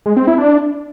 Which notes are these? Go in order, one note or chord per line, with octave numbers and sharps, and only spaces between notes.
G#3
C4
E4
D4